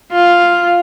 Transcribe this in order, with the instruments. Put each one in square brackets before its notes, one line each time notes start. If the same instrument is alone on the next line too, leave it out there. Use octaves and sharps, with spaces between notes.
[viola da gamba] F4